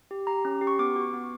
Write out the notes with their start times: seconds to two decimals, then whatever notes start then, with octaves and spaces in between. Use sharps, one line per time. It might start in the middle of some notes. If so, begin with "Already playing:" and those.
0.11 G4
0.27 G4 A#5
0.45 C#4
0.61 G4
0.67 C#6
0.79 B3 D6
0.96 F#4
1.13 B3